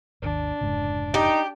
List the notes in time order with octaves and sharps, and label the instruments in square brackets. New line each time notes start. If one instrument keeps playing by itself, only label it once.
[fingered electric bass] G#1 D#2 [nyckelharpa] D4
[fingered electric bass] F1 G#2 C#3
[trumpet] D#4 [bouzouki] G4